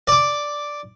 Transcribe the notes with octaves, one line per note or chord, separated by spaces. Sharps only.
D5 D6